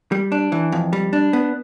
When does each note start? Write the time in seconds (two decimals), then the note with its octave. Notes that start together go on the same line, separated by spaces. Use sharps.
0.12 G3
0.32 D4
0.52 E3
0.72 F2
0.93 G3
1.13 D4
1.33 B3